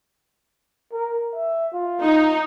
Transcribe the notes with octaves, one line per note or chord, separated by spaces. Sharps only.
A#4
E5
F4
D#4